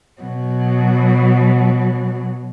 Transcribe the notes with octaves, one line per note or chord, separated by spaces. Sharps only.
B2 F#3